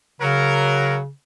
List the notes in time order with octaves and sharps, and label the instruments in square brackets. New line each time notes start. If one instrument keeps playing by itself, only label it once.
[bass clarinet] C#3 [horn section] F#3 A#4